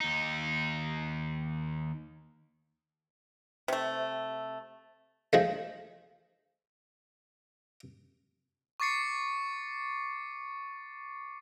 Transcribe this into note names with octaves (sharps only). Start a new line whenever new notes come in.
D#2 D#4
C3 A3
F3 G#3 A3
C#6 D6 A6 C7 C#7